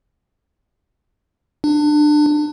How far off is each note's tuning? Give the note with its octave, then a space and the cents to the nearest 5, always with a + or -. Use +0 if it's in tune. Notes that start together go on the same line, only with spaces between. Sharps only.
D4 +25